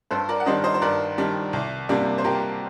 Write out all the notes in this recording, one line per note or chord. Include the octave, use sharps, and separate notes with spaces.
G2 A4 C5
A#4 D5
F#5
D#3 G3 D4 C5 D#5
C5 D#5
C5
G2 A#4 D5
D#3 G3 D4
C2
C3 G3 A#3 D4
C5
C2 G4 A#4